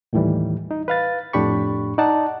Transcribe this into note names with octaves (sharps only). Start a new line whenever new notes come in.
D#2 A2 D#3 E3 G3
D#4
B4 F5 A6
F2 A2 D4 G4 B5 C#6
D#4 D5 F#5 A5